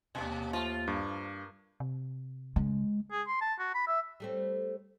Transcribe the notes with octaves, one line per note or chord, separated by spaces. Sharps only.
D#2 B2 G#3 D4
F3 A3 F4
G2 A#3
C3
C#3 G#3
G#4
C6
A5
F#4
B5
E5
G3 A3 C4